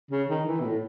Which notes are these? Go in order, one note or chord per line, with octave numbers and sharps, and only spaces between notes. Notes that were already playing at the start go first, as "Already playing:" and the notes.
C#3
D#3
E3
B2
A2